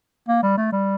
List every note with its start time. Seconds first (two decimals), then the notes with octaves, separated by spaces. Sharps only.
0.28 A#3
0.43 G3
0.57 A3
0.72 G3